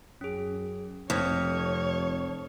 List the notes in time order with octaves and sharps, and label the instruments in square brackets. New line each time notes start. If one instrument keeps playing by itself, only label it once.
[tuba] F#2 [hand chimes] C#4 G#4
[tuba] F1 [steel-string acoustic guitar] F2 [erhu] C#5 [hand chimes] D#6 F6 G#6